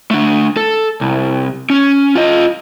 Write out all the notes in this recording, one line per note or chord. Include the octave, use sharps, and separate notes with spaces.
A3 D4
A4
C2
C#4
F4 D#5